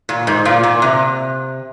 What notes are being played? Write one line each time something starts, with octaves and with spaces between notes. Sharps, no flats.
A#2
G#2
A#2
A#2
C3